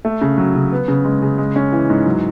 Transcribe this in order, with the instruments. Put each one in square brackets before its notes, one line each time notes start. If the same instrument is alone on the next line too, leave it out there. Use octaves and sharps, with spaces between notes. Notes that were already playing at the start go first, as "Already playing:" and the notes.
[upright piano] A3
C#3
F#3
C#3
B3
C#3
G#3
C#3
G#3
C#4
E3
G#2
F#3